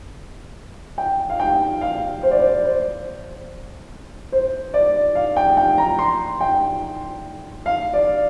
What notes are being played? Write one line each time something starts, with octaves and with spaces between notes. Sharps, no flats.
G5
F5
G5
F5
C5
D5
C5
C5
C5
D5
F5
G5
G5
A#5
C6
G5
F5
D5